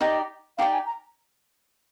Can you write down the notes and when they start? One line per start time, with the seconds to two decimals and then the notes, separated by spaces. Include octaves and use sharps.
0.01 D#4 G4 D5 D#5 G5
0.58 D#4 G4 D5 F5 G5
0.73 G#5
0.86 A#5